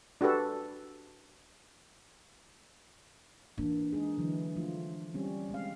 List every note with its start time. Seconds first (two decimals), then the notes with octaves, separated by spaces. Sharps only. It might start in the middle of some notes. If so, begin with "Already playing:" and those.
0.21 D4 F#4 G4 A4 B4
3.58 E3 A#3 D4
3.93 G#3 D#4 G#4
4.18 D3 E3 F#3
4.56 F3 A3 F4
5.14 G3 C4 C#4
5.51 G#3 C4 F5